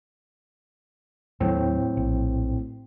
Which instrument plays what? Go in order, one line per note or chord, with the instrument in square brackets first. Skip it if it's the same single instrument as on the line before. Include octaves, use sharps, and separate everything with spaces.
[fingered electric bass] D#2 D#3 F#3 [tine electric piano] A2 C4
[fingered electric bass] A#1